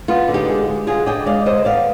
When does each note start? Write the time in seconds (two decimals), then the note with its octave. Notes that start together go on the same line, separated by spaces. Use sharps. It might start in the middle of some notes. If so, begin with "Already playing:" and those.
0.08 B3 F4
0.28 D3
0.34 D#4 G4
0.48 G#3
0.67 G#3
0.87 D3 F4 G#4
1.06 D4 D#5 G5
1.26 G#3 D5 F5
1.45 D3 C5 D#5
1.65 B3 D5 F5